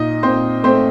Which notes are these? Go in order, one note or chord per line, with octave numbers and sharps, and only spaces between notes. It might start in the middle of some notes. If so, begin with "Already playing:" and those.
Already playing: A#2 D#4 D#5
A#2 C4 C5
A3 C4 C5